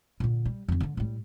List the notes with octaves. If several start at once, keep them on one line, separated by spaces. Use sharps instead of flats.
A#2 D3
G3
F2 D3
D3 B3
A2 G3